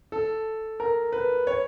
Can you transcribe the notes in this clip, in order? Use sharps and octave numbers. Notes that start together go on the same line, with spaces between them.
A4
A#4
B4
C#5